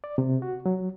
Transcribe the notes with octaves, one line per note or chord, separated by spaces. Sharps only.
D5
C3
F#4
F#3